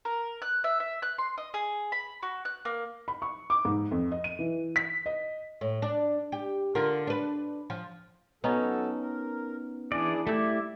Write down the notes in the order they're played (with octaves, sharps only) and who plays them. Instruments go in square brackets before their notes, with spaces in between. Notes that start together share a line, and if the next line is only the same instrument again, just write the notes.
[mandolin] A#4
F#6
E5
E5
F#6
C6
D#5
G#4
B5
F#4
F#6
A#3
[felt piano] B5
C#6
D6
G#2
F2
D#5
D#7
E3
B6
D#5
[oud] A2
D4
G4
D3 F4 A#4
D4 B4
F3
[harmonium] F#3 A4 [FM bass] B3 [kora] C#4 D#4
[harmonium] A#4
[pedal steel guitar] E3 D5 [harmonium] D4 E4 G#4
[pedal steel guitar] G3 E4 [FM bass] A3 [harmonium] G4